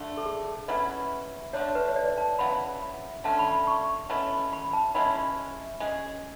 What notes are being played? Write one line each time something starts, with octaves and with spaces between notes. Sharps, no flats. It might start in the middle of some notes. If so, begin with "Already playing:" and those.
Already playing: D3 A3 D4
A4
G#4
B2 F#3 C#4 E4 B4
D3 A3 D4 C#5
B4
C#5
D5
A5
C#3 F#3 B3 E4 B5
D3 A3 C#4 A5
B5
B5
C#6
B2 A3 C#4 E4
B5
A5
B2 G#3 C#4 E4 B5
G#3 C#4 G#4